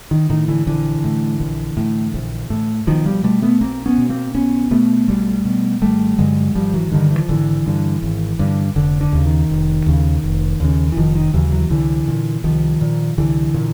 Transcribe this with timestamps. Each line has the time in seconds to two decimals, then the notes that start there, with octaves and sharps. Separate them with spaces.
0.11 D#3
0.30 A2 D#3
0.48 D3 E3
0.67 A#1 D3 E3
1.04 A2
1.40 A#1
1.77 A2
2.14 A#1
2.50 A2
2.87 B1 D#3 F3
3.05 F3 G3
3.23 B2 G3 A3
3.42 A3 B3
3.61 B1 A#3 C4
3.86 B3 C#4
3.98 B2
4.09 A#3 C4
4.35 B1 B3 C#4
4.71 B2 A3 B3
5.08 B1 G3 A3
5.45 B2
5.82 G#1 G3 A3
6.18 G2 D3 F#3 G#3
6.55 G#1 F3 G3
6.74 E3 F#3
6.92 G2 D3 D#3
7.11 E3
7.19 F3
7.29 G#1 D3 E3
7.66 G2 D3
8.02 G#1
8.39 G2 D3
8.76 F1 D3
9.01 D3
9.12 D#2 C#3
9.26 D#3
9.50 F1
9.86 D#2 C#3
10.24 F1
10.60 D#2 C#3
10.92 E3
10.97 F1 D#3 F3
11.15 D#3
11.34 D#2 C#3 E3 F#3
11.52 E3 F#3
11.70 C2 D3 E3
12.07 A#2
12.44 C2 D#3 F3
12.81 A#2
13.17 C2 D3 E3
13.54 A#2